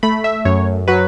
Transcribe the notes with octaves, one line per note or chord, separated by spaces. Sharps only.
A3 B5
E5
F#2 C#5
F#3 B4